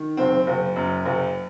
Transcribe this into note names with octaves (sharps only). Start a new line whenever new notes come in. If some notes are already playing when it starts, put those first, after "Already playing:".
Already playing: D#3
F#1 C4
F#1
F#2
F#1